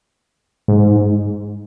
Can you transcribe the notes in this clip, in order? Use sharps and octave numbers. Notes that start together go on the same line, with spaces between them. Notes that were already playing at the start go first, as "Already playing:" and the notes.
G#2